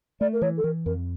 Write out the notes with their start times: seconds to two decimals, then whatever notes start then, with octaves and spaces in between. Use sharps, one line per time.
0.21 A3 D5
0.33 A#4
0.42 E3 C#5
0.57 A4
0.64 E3 A#4
0.86 F2 A#4